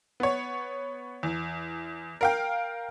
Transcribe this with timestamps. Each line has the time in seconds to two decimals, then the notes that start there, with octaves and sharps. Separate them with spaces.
0.20 B3 C#5
1.23 E2
2.21 A#4 F5 G5